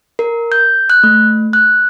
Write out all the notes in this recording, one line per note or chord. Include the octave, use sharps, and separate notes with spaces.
A#4
G6
F#6
A3
F#6